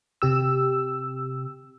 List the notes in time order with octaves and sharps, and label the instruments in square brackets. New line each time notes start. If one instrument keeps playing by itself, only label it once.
[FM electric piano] C3 G4 E6